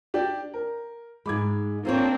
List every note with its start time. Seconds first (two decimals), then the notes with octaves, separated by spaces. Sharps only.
0.14 D4 G4 D5
0.54 A#4
1.26 G#2 G#3 B5 D6 G#6
1.85 A#3 C4 D4 F4 C5 C#5